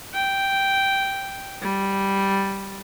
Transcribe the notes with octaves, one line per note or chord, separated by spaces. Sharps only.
G5
G3